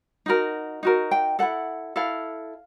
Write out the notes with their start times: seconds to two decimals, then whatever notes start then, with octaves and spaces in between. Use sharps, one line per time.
0.26 D#4 F#4 A#4
0.83 D#4 F#4 A#4
1.11 G5
1.39 E4 A4 F#5
1.96 E4 A4 F5